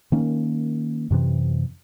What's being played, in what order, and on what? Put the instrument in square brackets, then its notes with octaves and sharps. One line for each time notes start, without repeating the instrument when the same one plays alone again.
[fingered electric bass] D#3 A#3 C#4
F#2 C3 E3